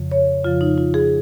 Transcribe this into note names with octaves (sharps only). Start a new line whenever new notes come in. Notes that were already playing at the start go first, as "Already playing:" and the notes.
Already playing: F2 C#3 F3
C#5
F2 C#3 F3 F4
D#4
F4
G#4